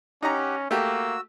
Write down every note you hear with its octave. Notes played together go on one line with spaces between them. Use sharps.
C#4 D#4 G4 F#5 A#5
A3 A#3 F#4 G4 E6